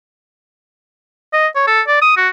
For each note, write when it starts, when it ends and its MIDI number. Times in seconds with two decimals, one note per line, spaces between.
1.33 1.47 75
1.55 1.64 73
1.67 1.81 69
1.87 1.97 74
2.02 2.12 87
2.17 2.29 66